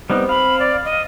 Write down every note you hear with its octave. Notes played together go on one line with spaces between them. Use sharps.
G3 B3 C4 D#4
F5 B5
D5
D#5